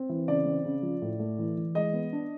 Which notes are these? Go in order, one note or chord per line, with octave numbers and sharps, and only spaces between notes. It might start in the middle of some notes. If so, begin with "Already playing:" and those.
Already playing: C4
E3
C#3 D5
C4
C#3
F3
A2
A3
E3
E3
G#3 D#5
B3
D4